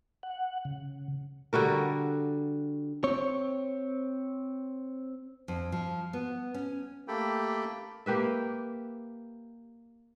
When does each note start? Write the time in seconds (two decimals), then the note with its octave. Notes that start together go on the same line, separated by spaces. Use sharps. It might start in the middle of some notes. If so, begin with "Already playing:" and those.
0.23 F#5
0.65 C#3
1.53 D3 G3 F#4 A#4
3.04 C4 C#5
5.48 F2
5.72 F3
6.13 B3
6.54 C#4
7.08 A3 A#3 G4 A4 G5 B5
8.06 A#3 G4 B4 E5